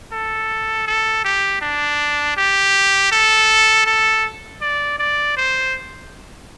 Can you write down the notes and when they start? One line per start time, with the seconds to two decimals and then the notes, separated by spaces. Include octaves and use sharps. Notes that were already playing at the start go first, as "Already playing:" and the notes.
0.12 A4
0.87 A4
1.24 G4
1.61 D4
2.37 G4
3.11 A4
3.86 A4
4.61 D5
4.99 D5
5.37 C5